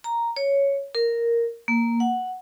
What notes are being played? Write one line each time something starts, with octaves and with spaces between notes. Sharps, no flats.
A#5
C#5
A#4
A#3
F#5